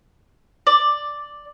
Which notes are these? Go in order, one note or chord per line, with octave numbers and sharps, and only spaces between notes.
D5